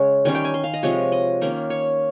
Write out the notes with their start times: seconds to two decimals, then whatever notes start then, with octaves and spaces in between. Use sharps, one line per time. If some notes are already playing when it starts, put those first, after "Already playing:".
Already playing: C#3 G#3 C#4 C#5
0.25 D#3 G3 C#4 G#5
0.35 G5
0.44 G#5
0.54 C6
0.64 F5
0.73 D#5
0.83 C3 F3 G#3 C#5
1.12 D#5
1.41 D#3 A#3 C#4
1.70 C#5